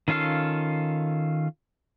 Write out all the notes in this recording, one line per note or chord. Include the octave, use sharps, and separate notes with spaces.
D#3 C#4 F4 A4 F5